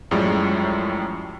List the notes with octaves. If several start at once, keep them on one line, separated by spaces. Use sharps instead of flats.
F#2 A2 F3 G3 G#3